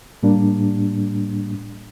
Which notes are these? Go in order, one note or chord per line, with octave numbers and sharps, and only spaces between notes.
A2 G3 A#3 D4